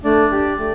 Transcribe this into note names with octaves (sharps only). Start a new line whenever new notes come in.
A3 D4 D5
D4 G4
A3